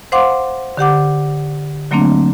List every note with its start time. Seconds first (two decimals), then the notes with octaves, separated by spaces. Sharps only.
0.12 C5 F5 F#5 C6 D6
0.77 D3 G4 F#5 D6
1.91 D3 F#3 A3 A#3 C4 D4